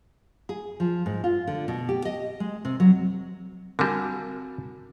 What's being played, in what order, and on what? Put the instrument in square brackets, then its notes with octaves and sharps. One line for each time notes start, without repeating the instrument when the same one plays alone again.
[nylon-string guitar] G#4
F3
G#2
F4
D3
B2
G4
D#5
G#3
C3
F#3
[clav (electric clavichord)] D3 G3 [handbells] C4 F#4 [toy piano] A#4 G#5